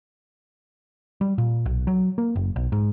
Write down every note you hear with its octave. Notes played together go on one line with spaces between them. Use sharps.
G3
A#2
B1
F#3
A#3
F#1
B1
G#2